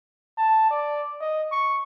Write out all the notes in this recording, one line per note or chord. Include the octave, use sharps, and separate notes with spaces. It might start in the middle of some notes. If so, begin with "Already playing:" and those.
A5
D5
D#5
C#6